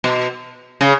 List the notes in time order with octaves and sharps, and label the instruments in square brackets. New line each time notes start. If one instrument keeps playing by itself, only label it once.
[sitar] B2
C#3